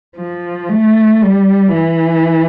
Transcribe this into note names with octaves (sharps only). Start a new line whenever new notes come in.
F3
A3
G3
E3